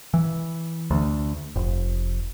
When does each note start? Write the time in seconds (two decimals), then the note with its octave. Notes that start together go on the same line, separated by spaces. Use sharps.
0.14 E3
0.91 D2
1.56 F1